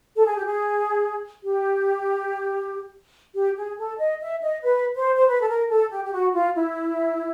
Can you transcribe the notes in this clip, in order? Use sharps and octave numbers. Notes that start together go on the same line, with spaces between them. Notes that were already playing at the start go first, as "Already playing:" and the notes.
A4
G#4
G4
G#4
G4
G4
G#4
A4
D#5
E5
D#5
B4
C5
C5
B4
A4
A#4
A4
G4
G4
F#4
F4
E4